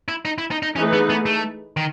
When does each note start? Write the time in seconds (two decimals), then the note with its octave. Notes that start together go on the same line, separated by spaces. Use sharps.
0.08 E4
0.25 D#4
0.38 E4
0.51 D#4
0.63 D#4
0.75 E3 A3 C#4 D#4 G#4 B4
0.93 B3
1.10 B3
1.26 A3
1.77 D#3